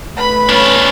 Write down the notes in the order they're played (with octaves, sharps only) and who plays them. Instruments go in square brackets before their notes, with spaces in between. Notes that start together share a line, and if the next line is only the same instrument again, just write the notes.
[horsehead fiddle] A3 B4 [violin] B5
[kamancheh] C#4 [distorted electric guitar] D4 F4